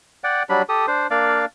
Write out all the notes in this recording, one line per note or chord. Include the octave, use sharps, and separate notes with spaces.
D5 F#5 G5
F#3 G3 D4 B5
G4 A4 D#6
D4 C5
A#3 D4 D5 F5